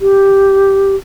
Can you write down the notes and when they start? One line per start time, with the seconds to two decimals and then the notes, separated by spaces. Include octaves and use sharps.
0.01 G4